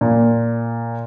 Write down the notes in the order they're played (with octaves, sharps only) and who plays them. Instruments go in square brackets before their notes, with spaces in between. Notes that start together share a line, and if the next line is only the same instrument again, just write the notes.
[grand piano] A#2